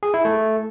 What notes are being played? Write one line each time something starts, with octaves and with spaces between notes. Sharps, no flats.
G#4
E4
A3